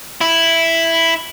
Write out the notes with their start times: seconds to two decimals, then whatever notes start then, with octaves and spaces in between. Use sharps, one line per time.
0.21 E4